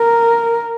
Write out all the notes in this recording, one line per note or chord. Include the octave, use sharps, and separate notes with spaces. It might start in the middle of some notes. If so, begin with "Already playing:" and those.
Already playing: A#4